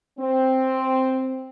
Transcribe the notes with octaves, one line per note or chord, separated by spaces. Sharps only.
C4